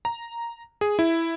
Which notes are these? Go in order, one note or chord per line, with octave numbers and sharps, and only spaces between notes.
A#5
G#4
E4